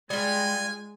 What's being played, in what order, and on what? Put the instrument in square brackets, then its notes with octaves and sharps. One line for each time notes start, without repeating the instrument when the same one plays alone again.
[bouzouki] G3 F4 [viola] G#3 [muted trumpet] G#5